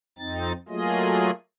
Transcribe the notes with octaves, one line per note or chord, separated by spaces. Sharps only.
F2 C4 D#4 A6
F#3 A3 A#3 F4 G#4 D#5